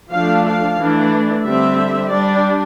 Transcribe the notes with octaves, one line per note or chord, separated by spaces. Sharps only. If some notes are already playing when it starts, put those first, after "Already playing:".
F3 A3 D4 F5
F5
E3 A3 D4
D3 G3 C4 E5
G3 D4 D5